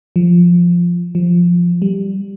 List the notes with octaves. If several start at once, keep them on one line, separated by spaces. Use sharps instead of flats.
F3
F3
G3